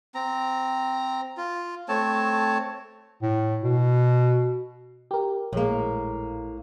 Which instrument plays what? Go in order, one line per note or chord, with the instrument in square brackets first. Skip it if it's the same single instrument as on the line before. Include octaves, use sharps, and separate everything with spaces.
[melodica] C4 A#5
F4
A3 C4 C#5 A5
[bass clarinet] A2
B2
[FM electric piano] G4 A#4
[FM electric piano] A#1 G#3 [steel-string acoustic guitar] A2 A#3